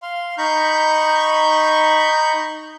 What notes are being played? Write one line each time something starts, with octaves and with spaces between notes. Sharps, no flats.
F5 C6
D#4 A#5 B5 C#6 G6